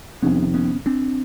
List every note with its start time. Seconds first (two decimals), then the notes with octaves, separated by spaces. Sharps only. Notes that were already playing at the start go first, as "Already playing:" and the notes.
0.22 F2 C3 D#3 G3 B3 C#4
0.54 B3 C#4
0.86 C4 D4